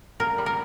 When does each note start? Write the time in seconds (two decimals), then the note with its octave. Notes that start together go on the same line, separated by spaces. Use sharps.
0.20 A#2 A#4
0.38 G3
0.46 A#4